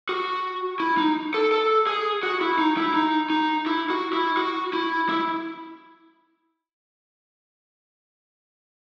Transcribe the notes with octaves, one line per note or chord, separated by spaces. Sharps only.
F#4
E4
D#4
A4
A4
G#4
F#4
E4
D#4
E4
D#4
D#4
E4
F#4
E4
F#4
E4
E4